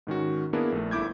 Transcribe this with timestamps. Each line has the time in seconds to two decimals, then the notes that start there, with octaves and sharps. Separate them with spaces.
0.07 G#2 D#3 C#4 F#4
0.53 A#3 B3 D4 E4 G#4 A#4
0.72 A#1 A3
0.91 G1 A3 E4 D6 G6 G#6